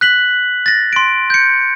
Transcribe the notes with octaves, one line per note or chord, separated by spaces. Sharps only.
F#6 B6 F#7
A6 A#6
C6 D7
G6 C#7